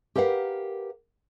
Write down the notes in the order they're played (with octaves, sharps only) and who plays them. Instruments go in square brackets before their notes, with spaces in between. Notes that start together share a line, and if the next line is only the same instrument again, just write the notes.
[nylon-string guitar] G4 A#4 B4 F5 F#5